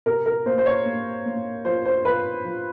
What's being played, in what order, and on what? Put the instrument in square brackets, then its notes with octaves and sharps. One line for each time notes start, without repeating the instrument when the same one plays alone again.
[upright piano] C3 A#4
A#4
A#3 C5
C5
C#5
A#3
A#3
F3 C5
C5
F3 B4
F3